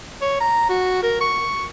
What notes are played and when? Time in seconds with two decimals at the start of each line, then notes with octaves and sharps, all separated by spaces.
0.22 C#5
0.41 A#5
0.70 F#4
1.03 A#4
1.21 C#6